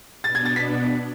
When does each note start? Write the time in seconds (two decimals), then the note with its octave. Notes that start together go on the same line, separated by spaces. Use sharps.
0.23 B2 B3 D4 A6
0.35 G#6
0.45 A6
0.56 B6